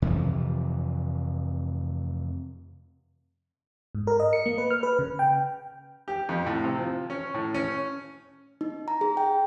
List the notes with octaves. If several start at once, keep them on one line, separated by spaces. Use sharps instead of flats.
F2 C3 E3 F3
G#2
A#4
D#5
C#7
A#3
B4
F6
B4
C#3
G5
G4
F2
A2
C3
F3
C#4
A2
C#4
D#4
A#5
G#4
G5